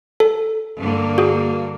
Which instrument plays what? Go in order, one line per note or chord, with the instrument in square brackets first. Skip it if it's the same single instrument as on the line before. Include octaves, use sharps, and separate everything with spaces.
[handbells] A4
[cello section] G2 D3 A#3
[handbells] F#4 G#4